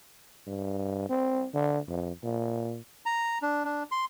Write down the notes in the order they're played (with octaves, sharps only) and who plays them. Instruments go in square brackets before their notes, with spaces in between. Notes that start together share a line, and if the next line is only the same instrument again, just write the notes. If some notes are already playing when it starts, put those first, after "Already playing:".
[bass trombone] G2
C4
D3
F2
A#2
[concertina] A#5
D4
D4
C6